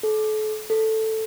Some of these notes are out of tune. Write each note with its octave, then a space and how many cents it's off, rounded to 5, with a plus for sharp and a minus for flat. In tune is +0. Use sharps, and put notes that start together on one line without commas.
A4 -35
A4 +5